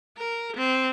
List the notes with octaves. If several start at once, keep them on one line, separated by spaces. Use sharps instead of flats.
A#4
C4